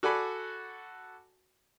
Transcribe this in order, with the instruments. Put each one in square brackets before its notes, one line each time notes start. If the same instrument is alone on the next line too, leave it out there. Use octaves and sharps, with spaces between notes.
[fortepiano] F#4 A4 D5 G#5 B5